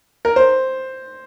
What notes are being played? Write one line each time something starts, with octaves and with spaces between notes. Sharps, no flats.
A#4
C5